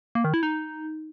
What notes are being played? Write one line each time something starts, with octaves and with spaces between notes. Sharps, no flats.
A#3
D#3
E4
D#4